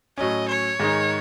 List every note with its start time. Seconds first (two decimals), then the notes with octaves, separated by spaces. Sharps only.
0.17 A2 F#3 C#4 D#5
0.49 C#5
0.80 G#2 D#3 G#3 D#4